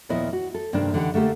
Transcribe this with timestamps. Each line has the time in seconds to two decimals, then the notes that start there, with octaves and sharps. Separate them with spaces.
0.09 D#2 A#2 F3 B3 E4 D#5
0.33 F#4
0.54 A4
0.73 G2 C3 D#3 A#3 D4
0.94 D3 E3 D#4 G4 F#5
1.14 D3 A3 A#3 G4 A4